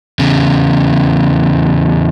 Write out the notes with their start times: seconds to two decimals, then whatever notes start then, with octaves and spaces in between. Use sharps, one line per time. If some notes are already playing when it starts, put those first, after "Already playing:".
0.19 E2 C#3